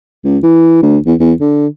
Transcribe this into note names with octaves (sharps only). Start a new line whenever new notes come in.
C#2
E3
D2
E2
E2
D3